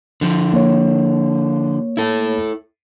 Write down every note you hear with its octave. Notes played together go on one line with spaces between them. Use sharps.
D3 F3
A#3 C#5
E4 A4